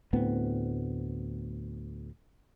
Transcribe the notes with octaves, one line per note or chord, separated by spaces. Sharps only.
D2 A2 B3 C4